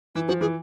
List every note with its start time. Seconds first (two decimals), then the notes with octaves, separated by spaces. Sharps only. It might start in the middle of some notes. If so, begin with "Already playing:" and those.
0.15 E3 E4
0.28 F3 F#4
0.41 E3 G#4